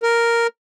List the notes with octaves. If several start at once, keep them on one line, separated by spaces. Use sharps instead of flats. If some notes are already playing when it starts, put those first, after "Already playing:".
A#4